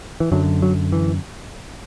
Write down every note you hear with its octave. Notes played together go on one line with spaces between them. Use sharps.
E3
F#2 D3 F#3
F#3
E3